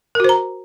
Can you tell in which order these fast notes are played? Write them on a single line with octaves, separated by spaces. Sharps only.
A#4 F#4 C5 A#5